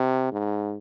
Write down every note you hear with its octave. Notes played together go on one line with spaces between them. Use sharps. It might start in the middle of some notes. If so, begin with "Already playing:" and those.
Already playing: C3
G#2